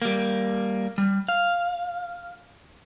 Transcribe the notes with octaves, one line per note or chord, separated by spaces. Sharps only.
G3 A#3
G3
F5